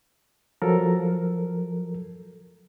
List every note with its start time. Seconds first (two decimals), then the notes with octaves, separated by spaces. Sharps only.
0.62 F3 F#3 A4 A#4